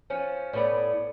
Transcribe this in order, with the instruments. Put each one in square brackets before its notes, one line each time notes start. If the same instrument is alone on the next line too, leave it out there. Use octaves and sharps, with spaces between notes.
[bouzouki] F3 C#4
A2 B3 D5